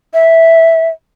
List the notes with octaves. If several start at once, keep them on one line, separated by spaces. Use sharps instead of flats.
E5